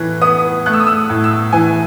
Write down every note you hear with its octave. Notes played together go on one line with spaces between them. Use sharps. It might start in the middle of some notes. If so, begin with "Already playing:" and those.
Already playing: A2 E3 F#6
B3 D#6
A3 F#6
E6
D#6
E6
A2
E6
E3 G#5